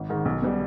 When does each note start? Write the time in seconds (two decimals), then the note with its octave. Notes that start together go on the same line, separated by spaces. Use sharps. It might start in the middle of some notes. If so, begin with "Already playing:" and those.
Already playing: G#1
0.09 G#2 D#3
0.25 B1
0.42 B2 G3